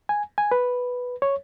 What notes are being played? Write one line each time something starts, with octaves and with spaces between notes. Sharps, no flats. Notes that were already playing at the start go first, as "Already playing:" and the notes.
G#5
G#5
B4
C#5